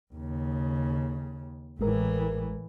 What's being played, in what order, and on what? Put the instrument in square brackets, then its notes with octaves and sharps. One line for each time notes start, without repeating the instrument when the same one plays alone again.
[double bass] D#2 C#3
[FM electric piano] A1 G#3 A#4 [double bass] A2 E3